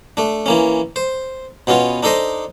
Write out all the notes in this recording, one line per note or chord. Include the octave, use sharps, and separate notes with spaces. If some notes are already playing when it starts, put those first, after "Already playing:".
A3 D4
E3 A#3 C#4
C5
B2 B3 C#4 F4
D4 D#4 A4 C5 D#5